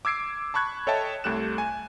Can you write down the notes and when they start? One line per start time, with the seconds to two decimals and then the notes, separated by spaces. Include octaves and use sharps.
0.05 D6 E6 G#6 C7 D7
0.54 A5 B5 C#6 F#6 G#6
0.87 A4 C#5 D#5 E5 G5 A5
1.24 C2 A3 G4 F#6 E7
1.58 G#5